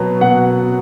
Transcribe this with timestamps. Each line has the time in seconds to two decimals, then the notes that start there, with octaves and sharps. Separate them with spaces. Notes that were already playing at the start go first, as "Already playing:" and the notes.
Already playing: B2 F#3 B3
0.21 B2 F#5